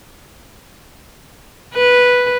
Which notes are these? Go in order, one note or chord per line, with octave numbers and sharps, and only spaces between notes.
B4